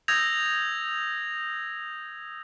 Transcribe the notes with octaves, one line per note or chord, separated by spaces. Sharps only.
D#6 E6 G6 G#6 A#6 F7